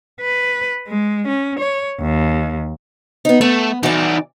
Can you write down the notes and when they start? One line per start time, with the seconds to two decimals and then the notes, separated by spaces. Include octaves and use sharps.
0.21 B4
0.88 G#3
1.27 C#4
1.60 C#5
2.01 D#2
3.25 B3 D#4
3.41 A3 B3
3.83 E3 D#4 F#4 D5